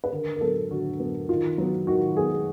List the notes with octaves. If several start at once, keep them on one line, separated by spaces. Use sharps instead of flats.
B4
D3 A#4
A#4
F#3 B3 A4
D3 F#4
F#3 B3
D#3 F4
F#3 B3
D#3 F#4
F#3 B3 G#4